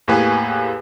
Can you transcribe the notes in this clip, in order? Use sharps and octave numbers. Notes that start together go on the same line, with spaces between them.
E2 A2 A#3 G4 B4 G#5